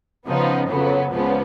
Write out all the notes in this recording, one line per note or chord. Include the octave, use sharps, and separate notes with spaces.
C#3 F3 B3 D#4
F2 C#3 F#3 B3
C#2 C#3 F3 B3